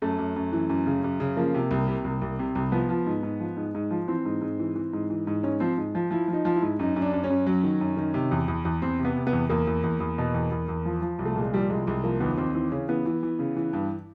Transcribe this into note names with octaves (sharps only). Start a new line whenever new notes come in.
F#2 A3
F#2
F#2
E3
F#2
C#3
F#2
C#3
F3 A#3
C3
C2
C3
C2
C2
C3
C2
F3 B3
F3
G#2
G#2
F3
G#2
G#2
F3
E3 C4
G#2
G#2
E3
E3
G#2
E3
G#2
G#2 C#4
F3 C4
G#2
F3
F3 E4
F3
D#4
F3
E4
G#2
F#2 D#4
F#2
D4
F#2
C#4
F#2
F#3
D#3
F#2
D#3
C3
E2
E2
E2
E2 C4
C3
B3
C3
B3
E2
E2 A#3
E2
E2
E2
B2
E2
E2
E2
F3
F3
C2
A3
A#2 G#3
F3 G3
C2 G#3
C2 G#3
F3 A#3
D#2 B3
D#2 C4
E3 C4
C#3 C#4
E3 B3
E3
E3
C#3
E3
G2